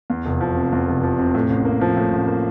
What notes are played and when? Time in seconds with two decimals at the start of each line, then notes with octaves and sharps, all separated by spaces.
0.10 E2
0.25 F1
0.41 F3
0.56 C3
0.72 E2
0.87 F1
1.03 F3
1.18 C3
1.35 A2
1.50 A1
1.65 A#3
1.81 F3
1.97 A2
2.13 A1
2.27 A#3